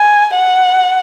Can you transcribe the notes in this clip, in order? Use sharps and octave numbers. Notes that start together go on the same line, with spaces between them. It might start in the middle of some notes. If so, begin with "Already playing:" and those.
Already playing: G#5
F#5